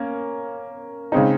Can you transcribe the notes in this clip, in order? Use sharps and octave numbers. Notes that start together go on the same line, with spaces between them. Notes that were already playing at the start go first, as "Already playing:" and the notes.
Already playing: A#3 C#4
C#3 G#3 C4 D#4